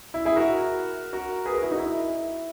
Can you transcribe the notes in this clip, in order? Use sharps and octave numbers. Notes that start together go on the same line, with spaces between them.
E4
E4 G#4
F#4 A#4
F#4 A#4
G#4 B4
F#4 A#4
E4 G#4
D#4 F#4
E4